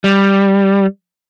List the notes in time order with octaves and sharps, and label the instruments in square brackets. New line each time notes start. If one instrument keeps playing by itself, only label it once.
[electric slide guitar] G3